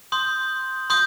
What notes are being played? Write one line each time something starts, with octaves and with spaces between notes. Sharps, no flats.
C6 D#6 G6
C6 D#6 G6